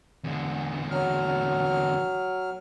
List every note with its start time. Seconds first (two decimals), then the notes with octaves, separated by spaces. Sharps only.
0.24 E2 D3
0.91 F#3 F6